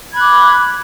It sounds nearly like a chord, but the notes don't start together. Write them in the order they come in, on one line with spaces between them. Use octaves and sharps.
G#6 B5 F#6 D6